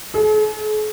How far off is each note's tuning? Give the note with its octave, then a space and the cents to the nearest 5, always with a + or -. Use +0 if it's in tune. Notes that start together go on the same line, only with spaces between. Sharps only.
G#4 +45